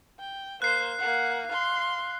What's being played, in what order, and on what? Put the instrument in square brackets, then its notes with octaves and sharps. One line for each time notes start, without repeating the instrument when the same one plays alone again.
[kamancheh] G5
[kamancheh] A#3 C5 [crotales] F#6 C7
[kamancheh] A#3 F#5
F5 C6